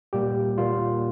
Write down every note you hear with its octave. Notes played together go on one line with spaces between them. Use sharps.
A#2 G3 A#3 G4
A#2 G3 A#3 F4